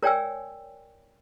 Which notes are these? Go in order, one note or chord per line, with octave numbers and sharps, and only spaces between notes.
A#4 C#5 D5 G5 G#5 E6